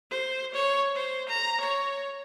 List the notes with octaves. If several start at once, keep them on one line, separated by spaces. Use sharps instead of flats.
C5
C#5
C5
A#5
C#5